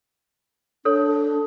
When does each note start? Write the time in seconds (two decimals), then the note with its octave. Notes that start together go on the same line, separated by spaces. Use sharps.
0.85 D4 A4 C#5